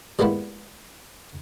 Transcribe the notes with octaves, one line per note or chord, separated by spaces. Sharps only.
G3 G#3 A#3 B3 E4